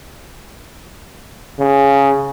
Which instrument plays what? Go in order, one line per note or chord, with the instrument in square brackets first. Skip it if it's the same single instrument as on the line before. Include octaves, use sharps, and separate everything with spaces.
[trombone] C#3